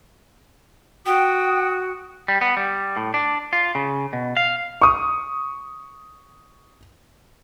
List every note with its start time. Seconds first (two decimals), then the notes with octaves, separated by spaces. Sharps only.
1.06 F#4 G5 D#6
2.28 G3
2.41 B3
2.57 G3
2.97 A2
3.14 D4
3.53 F4
3.75 C#3
4.13 B2
4.37 F5
4.82 C#6 D#6